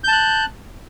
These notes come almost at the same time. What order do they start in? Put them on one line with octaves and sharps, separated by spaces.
G6 A5 F#6